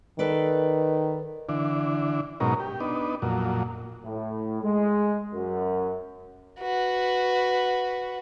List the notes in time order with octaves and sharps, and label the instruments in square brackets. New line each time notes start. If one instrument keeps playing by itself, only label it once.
[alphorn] D#3 [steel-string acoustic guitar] A4 B4 D5
[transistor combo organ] D3 E3 D4
G#2 B2 F#3 C#4 D#4 A#4
G4
B3 D4 D#4
F2 A#2 F#3
[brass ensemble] A2
G#3
F#2
[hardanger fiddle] F#4 B4